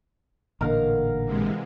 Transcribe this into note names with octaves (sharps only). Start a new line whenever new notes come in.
A1 A#2 D3 A#4 F5 F#5
C3 E3 G#3